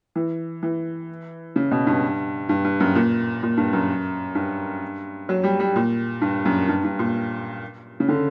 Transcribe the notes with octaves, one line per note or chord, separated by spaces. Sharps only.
E3
E3
C#3
B2
G2
G2
G2
F#2
A#2
A#2
G2
F#2
G2
F#3
G3
G3
A#2
G2
F#2
G2
G2
A#2
C#3
D3